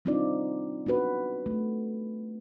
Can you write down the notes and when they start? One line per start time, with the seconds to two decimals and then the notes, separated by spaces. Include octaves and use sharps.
0.05 G3 C4 D4 D#4 F4 D5
0.86 B3 D4 F#4 B4
1.46 A3